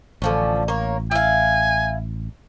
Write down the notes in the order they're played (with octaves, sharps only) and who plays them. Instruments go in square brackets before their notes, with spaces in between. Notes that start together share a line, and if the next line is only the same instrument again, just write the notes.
[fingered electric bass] A1 [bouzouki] D3 F3 C#4
[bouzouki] A#3 C#5
[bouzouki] E4 F5 [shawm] G#5